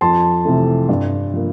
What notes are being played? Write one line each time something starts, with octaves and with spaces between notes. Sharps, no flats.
F2 A5 C6
C3 E3 A3
G2
F3 A#3